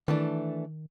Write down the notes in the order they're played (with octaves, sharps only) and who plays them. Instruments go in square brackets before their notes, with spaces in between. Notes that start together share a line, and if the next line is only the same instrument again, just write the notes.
[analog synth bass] D#3 [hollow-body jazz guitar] E3 A3 D4